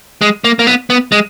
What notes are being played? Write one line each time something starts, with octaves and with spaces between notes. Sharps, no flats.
G#3
A#3
A#3
B3
B3
G#3